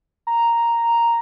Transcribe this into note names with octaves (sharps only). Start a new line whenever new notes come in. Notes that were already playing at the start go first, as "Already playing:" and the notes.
A#5